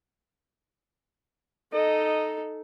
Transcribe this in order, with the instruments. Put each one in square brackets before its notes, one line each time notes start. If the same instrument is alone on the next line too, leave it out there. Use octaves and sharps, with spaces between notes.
[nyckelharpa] D#4 A4 [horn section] D#5